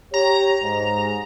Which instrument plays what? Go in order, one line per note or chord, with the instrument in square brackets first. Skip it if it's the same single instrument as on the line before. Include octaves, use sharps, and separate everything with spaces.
[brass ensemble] G4 C#5 [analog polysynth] A#5
[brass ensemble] G#2